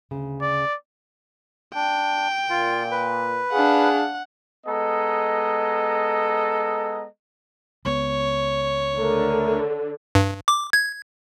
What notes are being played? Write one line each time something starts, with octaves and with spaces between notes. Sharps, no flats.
D2 C#3
D5
D4 G5
A#2 F4
B4
D4 G#4 F5 F#5
G#3 B3 A4 D#5 A#5
C#2 B3 C#5
D3 A3 A#4
G2
D6
G#6